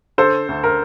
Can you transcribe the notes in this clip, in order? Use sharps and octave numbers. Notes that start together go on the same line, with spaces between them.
D3 A4 C5
D2
A#4